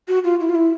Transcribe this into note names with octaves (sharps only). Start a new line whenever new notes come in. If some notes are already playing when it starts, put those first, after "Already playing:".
F#4
F4
E4
F4
E4